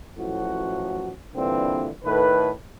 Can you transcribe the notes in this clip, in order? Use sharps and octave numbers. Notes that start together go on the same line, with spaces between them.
A1 A2 F3 F#3 F#4
G2 A#2 D3 E3 C4
A2 D#3 A4 B4